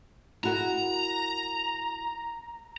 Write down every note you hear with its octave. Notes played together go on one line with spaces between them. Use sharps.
E4 F#4 A#4 A#5